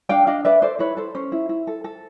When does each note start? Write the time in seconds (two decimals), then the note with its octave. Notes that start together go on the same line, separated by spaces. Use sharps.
0.09 D4 F5 G5
0.27 D4 D#5 F5
0.45 B4 D5 E5
0.62 A4 C5 D5
0.79 E4 B4 C#5
0.97 A4 C5
1.15 C#4 C5
1.32 E4
1.49 E4
1.67 A4
1.84 A4